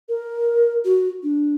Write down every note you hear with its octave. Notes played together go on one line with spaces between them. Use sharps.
A#4
F#4
D4